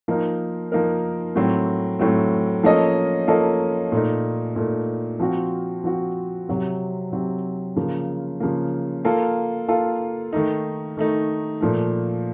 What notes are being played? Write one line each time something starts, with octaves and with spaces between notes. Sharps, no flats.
F3 A#3 D#4 A#4
F3 A#3 D#4 A#4
A2 F#3 C4
A2 F#3 C4
F3 A#3 C#4 A4 D#5
F3 A#3 C#4 A4 D#5
A#2 A3 D#4
A#2 A3 D#4
F3 C4 F#4
F3 C4 F#4
C3 F#3 C4
C3 F#3 C4
C#3 F3 A#3
C#3 F3 A#3
A#3 F4 A4
A#3 F4 A4
D#3 A3 D#4
D#3 A3 D#4
A#2 F3 A3